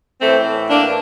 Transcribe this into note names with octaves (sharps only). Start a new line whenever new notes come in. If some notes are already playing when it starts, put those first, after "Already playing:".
A2 E3 A3 C4
A#3 D4